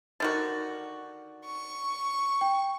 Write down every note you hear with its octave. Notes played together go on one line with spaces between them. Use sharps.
D3 D#3 F#4 A6
C#6
G5